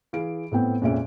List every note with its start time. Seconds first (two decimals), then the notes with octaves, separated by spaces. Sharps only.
0.13 E3 G#4 F5 D7
0.52 A2 B3 C4 G5
0.82 F2 A#2 G#3 C#4 E5 D7